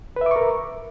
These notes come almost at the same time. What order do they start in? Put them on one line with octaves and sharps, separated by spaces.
B4 E5 D6 C#6 A#4